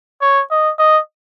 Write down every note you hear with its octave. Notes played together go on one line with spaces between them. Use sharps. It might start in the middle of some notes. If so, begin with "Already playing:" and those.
C#5
D#5
D#5